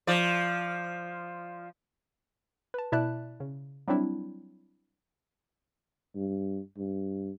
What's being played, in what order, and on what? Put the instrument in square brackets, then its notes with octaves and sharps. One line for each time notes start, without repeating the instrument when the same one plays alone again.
[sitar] F3 D5
[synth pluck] B4 A5
B2 E4 D5 E5 A5 F#6
C#3
F#3 G3 C4 D4 E4
[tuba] G2
G2